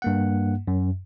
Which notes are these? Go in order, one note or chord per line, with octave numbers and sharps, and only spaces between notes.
G2 A#3 F#5
F#2